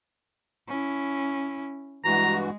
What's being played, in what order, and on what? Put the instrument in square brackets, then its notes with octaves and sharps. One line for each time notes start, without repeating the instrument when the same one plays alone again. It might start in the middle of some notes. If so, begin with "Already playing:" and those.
[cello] C#4 E4
[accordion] G2 E3 F#4 [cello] G#3 [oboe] A#5